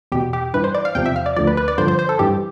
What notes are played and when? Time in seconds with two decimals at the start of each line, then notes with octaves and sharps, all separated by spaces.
0.12 E2 B2 G4
0.33 G4
0.54 G2 E3 B4
0.64 C5
0.75 D5
0.85 F5
0.95 E2 C3 F3 G5
1.06 E5
1.16 F5
1.26 D5
1.36 D2 D3 F3 D5
1.47 B4
1.57 B4
1.68 D5
1.78 G2 D3 F3 C5
1.88 C5
1.99 C5
2.09 A4
2.19 G2 E3 G4